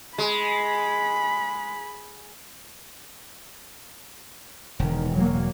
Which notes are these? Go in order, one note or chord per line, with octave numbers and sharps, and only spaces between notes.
G#3 B5 B6
E1 D#3
F#3 A#3